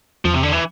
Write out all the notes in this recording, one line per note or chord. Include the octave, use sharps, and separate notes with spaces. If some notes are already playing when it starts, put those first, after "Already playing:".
E2 F3
C3
D3
E3